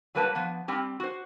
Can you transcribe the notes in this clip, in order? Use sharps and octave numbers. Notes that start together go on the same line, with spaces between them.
F#3 G3 A#3 B4 G#5 A5
F3 B3
G3 C4 G4
F#4 C5